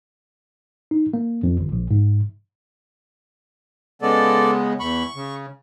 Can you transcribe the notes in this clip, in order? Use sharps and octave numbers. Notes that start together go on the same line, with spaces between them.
D#4
A#3
F2
G1
A#1
G#2
C#3 G#3 B3 A4 D5
E2 B5 C#6
C#3